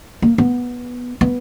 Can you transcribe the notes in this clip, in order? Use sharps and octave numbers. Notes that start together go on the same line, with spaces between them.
A#3
B3
B3